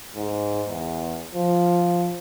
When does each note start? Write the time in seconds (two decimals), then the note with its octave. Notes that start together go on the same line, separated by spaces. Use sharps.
0.16 G#2
0.69 E2
1.34 F3